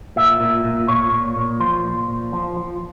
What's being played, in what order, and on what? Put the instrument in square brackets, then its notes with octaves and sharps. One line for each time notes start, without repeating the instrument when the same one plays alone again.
[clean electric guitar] A#2 E5
A#2
A#2
A#2 C#5
A#2
A#2
F3 C5
A#2
A#2
F3
F3